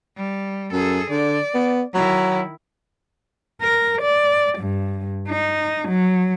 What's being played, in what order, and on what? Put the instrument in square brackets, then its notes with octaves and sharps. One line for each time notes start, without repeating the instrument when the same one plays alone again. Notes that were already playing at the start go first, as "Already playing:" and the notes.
[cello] G3
[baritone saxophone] F#2 [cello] G#4 A4
[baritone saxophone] D3 [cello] D5
[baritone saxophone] B3
[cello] D#3 E4 [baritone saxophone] F#3
[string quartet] A#4
D5
G2
D#4
F#3